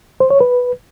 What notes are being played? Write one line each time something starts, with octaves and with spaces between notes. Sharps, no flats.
C5
C#5
B4